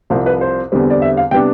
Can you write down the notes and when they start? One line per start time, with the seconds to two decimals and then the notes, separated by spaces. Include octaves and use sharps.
0.10 C2 C3 F3 C5
0.26 B4
0.41 C5
0.72 E2 D3 G3 C4
0.90 D5
1.02 E5
1.17 F5
1.31 C3 G3 B3 D4 G5